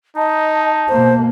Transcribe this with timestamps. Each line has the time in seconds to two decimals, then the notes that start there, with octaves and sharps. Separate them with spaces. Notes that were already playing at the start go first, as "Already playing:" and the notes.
0.17 D#4 D#5 A5
0.89 B2 A#3 C5